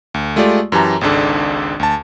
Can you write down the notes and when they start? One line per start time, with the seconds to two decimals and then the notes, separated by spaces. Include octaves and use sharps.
0.14 D2
0.36 G#3 A3 F4 G4 D5
0.72 F#2 E3 G4 A5 A#5
1.01 G#1 C#2 G#2 D4 A4
1.80 D2 A5